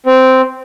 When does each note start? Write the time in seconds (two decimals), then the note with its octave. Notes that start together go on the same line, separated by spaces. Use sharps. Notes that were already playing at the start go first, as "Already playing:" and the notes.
0.06 C4